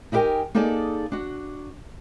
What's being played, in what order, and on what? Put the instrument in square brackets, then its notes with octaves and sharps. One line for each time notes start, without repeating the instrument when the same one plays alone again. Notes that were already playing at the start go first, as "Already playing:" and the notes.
[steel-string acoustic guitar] D#4 E4 G4 A#4 G5 G#5
A#3 D#4 G#4 A4 D5 A5
D4 F#4